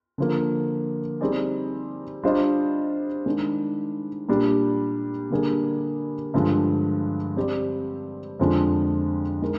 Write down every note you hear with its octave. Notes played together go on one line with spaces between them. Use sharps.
D3 F3 A#3
G3 C4 D#4 G#4 D5
G3 D4 F4 C5 D#5
D#3 G#3 D4
A#2 G3 D4 G4
D3 G3 A#3 D4 G#4
G2 D3 F3 G#3
G3 C4 G4 D5
F2 D3 F3 G#3 D4
G#3 D#4 A#4